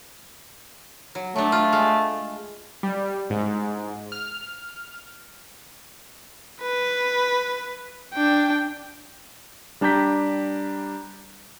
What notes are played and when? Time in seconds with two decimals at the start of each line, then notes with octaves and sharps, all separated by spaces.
1.15 F#3
1.36 F#3 A3 D4
1.52 F4
1.72 G#3 F5
2.83 G3
3.30 G#2
4.12 F6
6.61 B4
8.13 D4 G5
9.81 G3 D4 G4 A#5 G6 B6